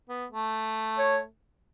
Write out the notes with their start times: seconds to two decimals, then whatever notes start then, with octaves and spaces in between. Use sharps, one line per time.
0.09 B3
0.31 A3
0.98 C#5